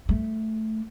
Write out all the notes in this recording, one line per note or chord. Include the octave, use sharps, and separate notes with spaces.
A3